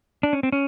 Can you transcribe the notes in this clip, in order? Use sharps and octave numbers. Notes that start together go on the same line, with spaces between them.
D4
C#4
C4
C#4